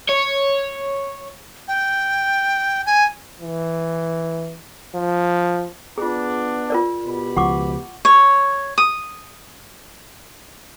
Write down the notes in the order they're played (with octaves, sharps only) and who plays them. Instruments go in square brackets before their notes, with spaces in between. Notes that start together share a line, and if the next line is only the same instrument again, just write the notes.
[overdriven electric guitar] C#5
[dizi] G5
G#5
[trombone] E3
F3
[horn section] B3 D4 [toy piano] F4 G#4
[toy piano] F4 A#4 D5
[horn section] B2 G4 B5
[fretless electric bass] C#2 F3 [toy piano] F#5 C#6 D6
[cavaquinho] C#5
D#6